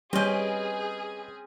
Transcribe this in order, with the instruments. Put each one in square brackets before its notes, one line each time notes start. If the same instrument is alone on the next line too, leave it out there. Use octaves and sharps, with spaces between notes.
[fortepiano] G3 [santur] C4 C#4 G5 [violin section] G#4 [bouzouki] B4 D#5